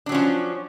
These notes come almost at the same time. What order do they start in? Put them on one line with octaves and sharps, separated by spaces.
D4 F#3 C#4 F3